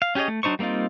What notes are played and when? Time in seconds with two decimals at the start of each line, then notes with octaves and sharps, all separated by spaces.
0.02 F5
0.15 C#4 G4 G#4 C#5 D#5
0.28 A3
0.43 F#3 D4 D#4 C5 C#6
0.59 G3 A#3 C4 D#4 F4